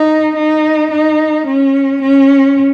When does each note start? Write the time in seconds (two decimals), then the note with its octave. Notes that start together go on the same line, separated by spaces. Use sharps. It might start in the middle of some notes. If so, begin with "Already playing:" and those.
Already playing: D#4
0.36 D#4
0.91 D#4
1.47 C#4
2.02 C#4